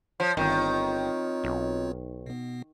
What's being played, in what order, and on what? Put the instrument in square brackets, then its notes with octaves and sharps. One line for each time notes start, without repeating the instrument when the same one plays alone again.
[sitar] F3 [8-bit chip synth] C#5
[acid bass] G1 [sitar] D#3 [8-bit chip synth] C4 F4 C#5
[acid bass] B1
[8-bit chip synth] B2 B3